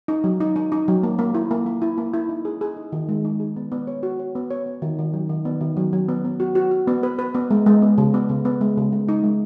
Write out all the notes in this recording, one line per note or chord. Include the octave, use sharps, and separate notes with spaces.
D#4
F#3
D#4
D#4
D#4
F#3
A#3
A#3
E4
A#3
A#3
E4
A#3
E4
D#4
G#4
G#4
D#4
D#3
G#3
D#4
G#4
B3
B3
C#5
F#4
C#5
B3
C#5
B3
D#3
D#3
F#3
D#3
B3
D#3
F#3
F#3
B3
B3
F#4
F#4
F#4
B3
B4
B4
B3
G#3
G#3
B3
C#3
B3
C#3
B3
G#3
C#3
G#3
D#4
G#3